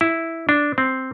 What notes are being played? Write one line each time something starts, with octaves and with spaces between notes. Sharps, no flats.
E4
D4
C4